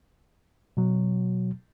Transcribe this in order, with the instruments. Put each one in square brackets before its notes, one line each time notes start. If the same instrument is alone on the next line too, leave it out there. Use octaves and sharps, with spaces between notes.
[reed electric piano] B2 F#3